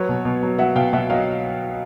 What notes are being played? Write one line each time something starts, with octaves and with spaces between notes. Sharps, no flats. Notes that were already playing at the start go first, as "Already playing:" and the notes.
Already playing: F#3 B4 C#5
B2
B2
F#3
F#3 E5 F#5
B2 F5 G5
B2 E5 F#5
F#3 D#5 F5